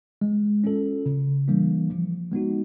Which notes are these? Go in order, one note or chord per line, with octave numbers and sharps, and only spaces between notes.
G#3
C#4 F4 A4
C#3
E3 G3 A#3 D4
F3
G#3 B3 D#4 F#4